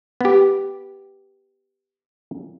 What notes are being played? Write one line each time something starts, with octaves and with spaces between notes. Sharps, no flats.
B3 G4